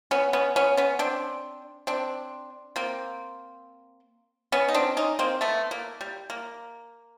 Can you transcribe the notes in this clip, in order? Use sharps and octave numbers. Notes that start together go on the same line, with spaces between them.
B3 C#4
B3 C#4
B3 C#4
B3 C#4
C4 D4
C4 D4
A#3 C4
B3 C#4
D#4
C4 D4
C#4 D#4
A#3 C4
A3 B3
A#3
G3
A#3